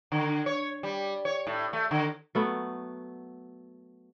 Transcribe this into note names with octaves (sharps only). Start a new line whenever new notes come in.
D3
C#5
G3
C#5
A2
A3
D3
F#3 A3 B3